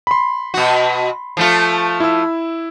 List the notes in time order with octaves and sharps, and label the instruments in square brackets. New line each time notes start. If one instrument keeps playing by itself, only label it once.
[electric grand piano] B5 C6
[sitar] B2 F#4
F3 A3 F4
[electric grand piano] E4 E6